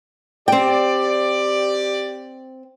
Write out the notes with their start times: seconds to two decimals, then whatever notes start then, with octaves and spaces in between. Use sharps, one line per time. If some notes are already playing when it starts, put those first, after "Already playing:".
0.48 C4 G4 D5 G5